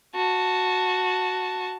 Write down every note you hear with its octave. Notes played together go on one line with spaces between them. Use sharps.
F#4 A5